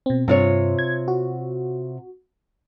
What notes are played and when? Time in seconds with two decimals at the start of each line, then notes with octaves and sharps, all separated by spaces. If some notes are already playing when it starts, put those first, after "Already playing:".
0.06 B2 C4
0.28 G2 C3 F4 C#5
0.79 G#6
1.08 F#4